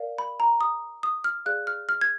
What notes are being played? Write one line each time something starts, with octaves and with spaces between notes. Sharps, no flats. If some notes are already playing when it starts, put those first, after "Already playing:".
Already playing: A#4 D5 F5
B5
A#5
D#6
D#6
F6
G#4 D5 F5 F#6
F6
F6
G#6